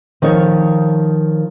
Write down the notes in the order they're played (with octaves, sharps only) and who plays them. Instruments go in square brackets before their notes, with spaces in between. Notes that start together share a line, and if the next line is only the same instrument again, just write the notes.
[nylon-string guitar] D#3 F3 D#4 C#5